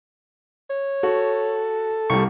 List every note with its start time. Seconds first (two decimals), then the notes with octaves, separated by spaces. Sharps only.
0.70 C#5
1.03 F#4 A4
2.10 C2 G3 C#6